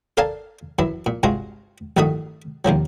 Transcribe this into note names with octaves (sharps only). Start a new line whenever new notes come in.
A4 A#4 D5 F5 G#5 A5
F#2 E3 E4
A#2
G2 C3 G#3 F4 F#4
A1 G2 D#3 A3 F#4 D#6
D#2 C3 F3 F#3